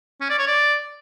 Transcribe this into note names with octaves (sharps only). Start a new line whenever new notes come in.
C#4
D5
C#5
D5